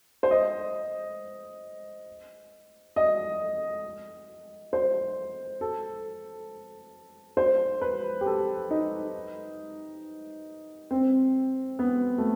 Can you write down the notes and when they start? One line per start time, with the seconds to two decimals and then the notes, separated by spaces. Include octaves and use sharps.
0.23 C5
0.31 D#5
2.96 D#5
4.73 C5
5.61 A4
7.37 C5
7.81 B4
8.21 G4
8.26 A4
8.70 D#4
10.91 C4
11.79 B3
12.18 A3